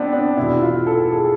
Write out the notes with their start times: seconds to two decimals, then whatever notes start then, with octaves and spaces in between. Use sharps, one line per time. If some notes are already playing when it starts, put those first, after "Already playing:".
Already playing: B3 C4 D4
0.13 D4
0.36 E2 B2 E4
0.62 F4
0.87 A4
1.12 G#4